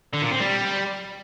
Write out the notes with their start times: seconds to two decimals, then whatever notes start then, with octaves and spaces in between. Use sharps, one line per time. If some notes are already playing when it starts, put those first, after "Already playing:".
0.13 D3
0.22 A#2
0.31 C4
0.40 G3